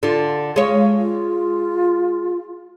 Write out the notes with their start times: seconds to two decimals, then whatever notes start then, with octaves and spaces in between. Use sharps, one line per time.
0.03 D3 F4
0.56 G#3 C#5 F5
0.97 F4